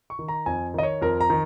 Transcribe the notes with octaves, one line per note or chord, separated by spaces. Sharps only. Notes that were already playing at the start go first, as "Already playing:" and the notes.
C#6
D#3
A#5
F2 G#5
D#3 D#5
C#5
F2 A#4
A#5
D#3